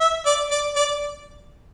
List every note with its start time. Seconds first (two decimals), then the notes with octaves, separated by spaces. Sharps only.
0.01 E5
0.26 D5
0.51 D5
0.76 D5